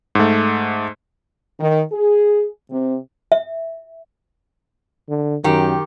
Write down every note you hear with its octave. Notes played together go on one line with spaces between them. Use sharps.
G#2 A3
D#3
G#4
C3
E5
D3
F#2 D#3 G4